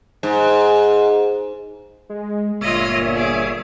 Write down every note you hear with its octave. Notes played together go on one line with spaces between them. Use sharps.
G#2
G#3
G1 A#2 F4 C#5 D#5 E5
G#4 D6